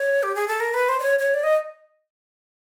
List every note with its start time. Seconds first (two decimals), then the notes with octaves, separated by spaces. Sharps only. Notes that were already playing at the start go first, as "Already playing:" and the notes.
Already playing: C#5
0.23 G4
0.35 G#4
0.48 A4
0.60 A#4
0.74 B4
0.89 C5
1.00 D5
1.03 C#5
1.19 C#5
1.34 D5
1.43 D#5